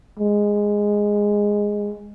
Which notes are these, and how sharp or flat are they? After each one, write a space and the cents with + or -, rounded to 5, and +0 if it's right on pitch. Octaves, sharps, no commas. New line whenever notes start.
G#3 -10